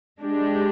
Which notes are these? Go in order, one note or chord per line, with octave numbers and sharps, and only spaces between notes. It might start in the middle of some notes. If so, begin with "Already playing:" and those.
G#3 D4 G4